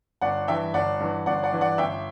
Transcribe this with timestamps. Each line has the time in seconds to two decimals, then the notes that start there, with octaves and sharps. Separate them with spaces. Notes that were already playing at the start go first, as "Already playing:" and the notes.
0.21 G1 D5 F#5
0.48 G2 E3 E5 G5
0.74 G1 D5 F#5
1.00 G2 E3
1.26 G1 D5 F#5
1.44 D5 F#5
1.53 G2 E3
1.61 D5 F#5
1.78 G1 E5 G5